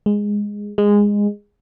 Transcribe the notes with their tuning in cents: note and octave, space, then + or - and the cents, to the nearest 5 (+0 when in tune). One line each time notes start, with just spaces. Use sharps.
G#3 -10
G#3 -15